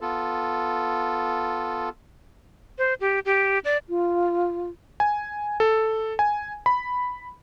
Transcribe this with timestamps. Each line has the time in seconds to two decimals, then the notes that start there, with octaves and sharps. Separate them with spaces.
0.01 B3 F4 A4
2.78 C5
3.01 G4
3.25 G4
3.65 D5
3.88 F4
5.00 G#5
5.60 A4
6.19 G#5
6.66 B5